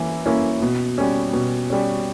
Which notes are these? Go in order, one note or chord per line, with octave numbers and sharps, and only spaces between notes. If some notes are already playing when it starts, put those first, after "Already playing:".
Already playing: E3 A#3 C#4 E4
A#3 C#4 E4
B2
G3 C#4
B2
G3 C#4